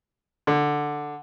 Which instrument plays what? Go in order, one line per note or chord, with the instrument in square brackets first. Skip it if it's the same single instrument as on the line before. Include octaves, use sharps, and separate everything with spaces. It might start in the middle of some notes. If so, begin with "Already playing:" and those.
[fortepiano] D3